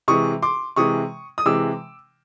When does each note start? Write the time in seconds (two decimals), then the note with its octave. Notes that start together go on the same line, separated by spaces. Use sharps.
0.08 C3 E3 G#3 C#6 D#6
0.42 C6 D6
0.76 C3 E3 G#3 C#6 D#6
1.38 D#6
1.46 C3 E3 G#3 D6 E6